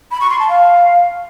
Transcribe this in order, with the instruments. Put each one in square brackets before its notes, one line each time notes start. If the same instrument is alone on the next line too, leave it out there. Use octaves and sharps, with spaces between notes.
[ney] B5
C#6
C6
A5
F5